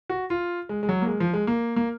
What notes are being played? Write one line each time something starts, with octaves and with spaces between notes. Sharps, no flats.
F#4
F4
G#3
G#3
F#3
A#3
G#3
F3
G#3
A#3
A#3